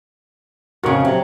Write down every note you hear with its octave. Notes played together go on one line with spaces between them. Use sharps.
F2 C#3 F#4 A#4 C#6
C3 F#3